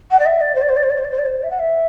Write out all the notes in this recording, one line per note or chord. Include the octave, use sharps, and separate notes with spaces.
F#5
D5
E5
D5
C5
D5
C5
D5
C5
D5
C5
D5
C5
D5
C5
E5
F#5
E5